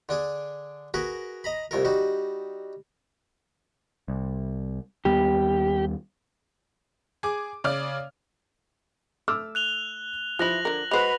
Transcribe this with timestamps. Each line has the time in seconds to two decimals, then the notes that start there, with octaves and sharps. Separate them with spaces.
0.09 D3 D4 G#4
0.94 F#4 G#4 A#4 B4
1.44 D#5 A#5 B5
1.71 C2 F2 A4 A#4
1.85 G3 D#4 F#4
4.08 C2
5.05 D#2 G3 B3 G4
7.23 G#4 D6
7.64 C#3 D5 F6
9.28 A3 D6 E6 F6
9.55 F#6 F7 G7
10.39 E3 F3 E4 F#6 A#6 F#7
10.65 D3 A#4
10.91 G#3 F#4 B4 C5 B5 F7